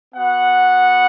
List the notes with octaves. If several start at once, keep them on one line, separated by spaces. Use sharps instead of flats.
B3 F#4 F#5